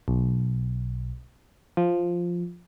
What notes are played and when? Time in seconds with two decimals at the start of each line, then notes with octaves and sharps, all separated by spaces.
0.08 B1
1.77 F3